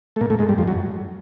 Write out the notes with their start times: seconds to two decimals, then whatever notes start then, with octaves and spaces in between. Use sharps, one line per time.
0.16 A3
0.21 A#2 A#3
0.30 A2 A3
0.39 G#2 G#3
0.49 G2 G3
0.58 F2 F3
0.67 F#2 F#3